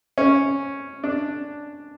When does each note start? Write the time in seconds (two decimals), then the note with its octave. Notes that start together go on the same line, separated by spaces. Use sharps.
0.18 C#4
1.04 D4